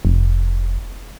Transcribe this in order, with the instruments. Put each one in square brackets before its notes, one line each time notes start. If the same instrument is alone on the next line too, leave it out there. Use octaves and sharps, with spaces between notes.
[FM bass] F1